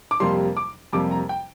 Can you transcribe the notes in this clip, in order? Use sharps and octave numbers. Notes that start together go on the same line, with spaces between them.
D6
F2 C3 G3 A#3 C6
D6
F2 C3 G3 A#3 D6
A#5
G5